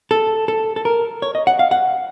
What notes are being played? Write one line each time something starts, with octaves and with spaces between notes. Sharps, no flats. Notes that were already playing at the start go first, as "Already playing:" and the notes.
A4
A4
A4
A#4
C#5
D#5
F#5
F5
F#5